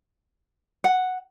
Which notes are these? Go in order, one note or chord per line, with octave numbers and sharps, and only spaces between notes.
F#5